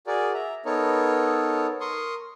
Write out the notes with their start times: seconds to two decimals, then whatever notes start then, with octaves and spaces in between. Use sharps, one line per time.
0.07 F#4 G#4 A#4 D5
0.34 E5 A#5
0.65 B3 D#4 A4 A#4 C#5
1.81 A#4 C6 C#6 D#6